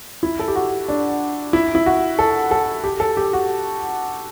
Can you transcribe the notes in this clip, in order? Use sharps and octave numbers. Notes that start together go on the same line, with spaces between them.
E4
A4
G4
F#4
D4
E4
E4
F#4
A4
A4
G4
A4
G4
F#4